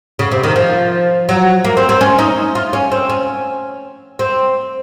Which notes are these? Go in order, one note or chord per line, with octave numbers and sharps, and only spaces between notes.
C#3
C3
D#3
F3
F#3
A#3
C4
C4
C#4
D#4
F4
C#4
C4
C#4
C4